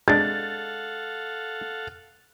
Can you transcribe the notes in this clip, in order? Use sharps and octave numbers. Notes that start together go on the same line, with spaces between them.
G#3 D4 A4 F5 F#5 A6